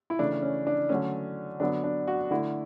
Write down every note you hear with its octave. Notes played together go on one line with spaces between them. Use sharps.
E4
C#3 E3 A3 D4
C#4
D4
D3 F#3 A3 C#4
D3 F#3 B3 D4
D4
F#4
D3 A3 E4